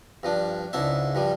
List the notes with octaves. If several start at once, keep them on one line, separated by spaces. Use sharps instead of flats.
G2 F3 D4
C#2 G#2 D4 E4 E5
G2 F3 G3